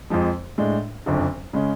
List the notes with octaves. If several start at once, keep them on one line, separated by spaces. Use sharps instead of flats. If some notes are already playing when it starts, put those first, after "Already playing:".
F2 F3 G#3
A2 G#3 D4
F#1 F2 D3
C#3 G#3 C#4